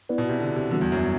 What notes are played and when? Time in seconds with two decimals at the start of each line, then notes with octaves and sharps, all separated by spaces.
0.09 B3 E4 B4 D5
0.18 B2
0.29 C3
0.40 D3
0.56 C3
0.71 D3 E3 G3 B3 D4 F#4
0.81 E2
0.92 F#2